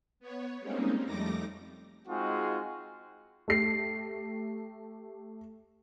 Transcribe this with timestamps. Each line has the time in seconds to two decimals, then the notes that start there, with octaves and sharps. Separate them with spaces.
0.20 B3 C#5
0.60 G3 G#3 A#3 C4 C#4 D#4
1.05 F2 G3 A3 D#4 D6 A#6
2.08 G#3 C4 D#4 F4 F#4 G#4
3.48 A3 G4 C7